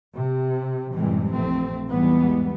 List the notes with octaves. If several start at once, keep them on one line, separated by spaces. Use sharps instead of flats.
C3
F#2 A2 C3 E3 G3 G#3
A#1 F2 A3 C4
E2 G#2 E3 G3 G#3 B3